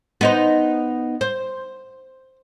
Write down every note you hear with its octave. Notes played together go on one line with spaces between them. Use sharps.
B3 D#4 C5
C5